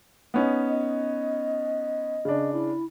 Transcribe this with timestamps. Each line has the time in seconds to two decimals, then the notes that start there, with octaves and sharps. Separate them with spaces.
0.34 B3 C#4 D#4
0.69 D#5
2.25 C#3 D4
2.53 E4